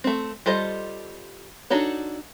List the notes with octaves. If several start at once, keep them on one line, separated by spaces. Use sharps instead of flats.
A3 C4
G3 F4 A4 C5 D#5
D4 D#4 F#4 A4 C#5